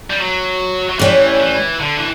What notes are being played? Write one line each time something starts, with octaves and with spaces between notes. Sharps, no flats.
G3
F#3
F#3
A2 E3 G3 C#4
E3
D3
E3